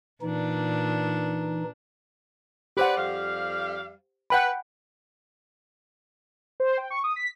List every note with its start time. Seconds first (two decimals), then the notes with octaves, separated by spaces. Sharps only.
0.22 A#2 E3 D4 D#4
2.77 G4 B4 C5 D5 F#5
2.97 F2 G3 F5
4.30 B4 F#5 G5 B5
6.60 C5
6.77 G5
6.90 C#6
7.04 D#6
7.16 B6